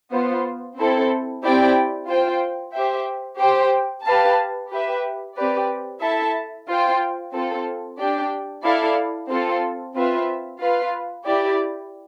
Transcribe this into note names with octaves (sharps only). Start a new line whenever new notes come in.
B3 F4 C5
C4 E4 A4
C4 E4 G4 D5 G5
F4 C5 G5
G4 C5 E5 G5
G4 C5 G5
G4 B4 F5 A5
G4 B4 E5
C4 G4 B4 D5
E4 A4 E5 A5
F4 C5 G5
C4 F4 A4
D4 G4 D5 G5
E4 A4 D5 F5
C4 F4 A4
C4 F4 B4 E5
F4 B4 F5
E4 G4 D5